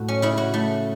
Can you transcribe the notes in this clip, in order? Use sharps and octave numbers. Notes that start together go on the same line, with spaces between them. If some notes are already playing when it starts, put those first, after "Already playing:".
Already playing: A2 F#4 A4
C#4
C#3 E4
F#4
A3